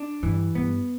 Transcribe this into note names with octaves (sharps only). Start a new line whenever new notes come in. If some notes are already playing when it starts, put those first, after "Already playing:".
Already playing: D4
G2 E3
G2 B3